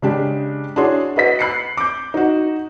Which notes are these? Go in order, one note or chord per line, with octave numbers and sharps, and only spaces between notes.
C#3 G#3 D4 G4
D4 E4 F#4 G#4 C#5 C6
F#4 B4 D#5 B6
B5 F#6 C7 C#7
D6 G6
D#4 F#4